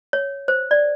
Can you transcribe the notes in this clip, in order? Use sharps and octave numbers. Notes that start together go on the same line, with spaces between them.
C#5
C5
D5